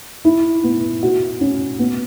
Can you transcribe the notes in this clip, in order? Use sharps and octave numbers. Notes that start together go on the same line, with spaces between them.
E4
B3
F#4
C#4
B3